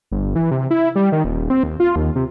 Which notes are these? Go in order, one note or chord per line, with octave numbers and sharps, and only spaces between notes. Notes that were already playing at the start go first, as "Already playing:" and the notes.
G1
E3
C3
E4
G3
D#3
D#1
C4
D#2
F4
D#2
C3